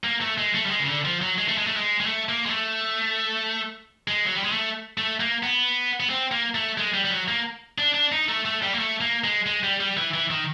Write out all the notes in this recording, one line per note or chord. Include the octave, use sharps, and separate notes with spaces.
A#3
A3
G#3
A3
G3
G#3
C#3
D3
F3
F#3
G#3
A3
G#3
A3
G#3
G#3
A3
A#3
G#3
A3
G#3
F#3
G3
G#3
A3
A3
A#3
B3
B3
C4
A#3
A3
G#3
G3
G3
F#3
A#3
D4
D4
D#4
A3
A3
G3
A#3
A3
A#3
G#3
G#3
G3
G3
E3
E3
D#3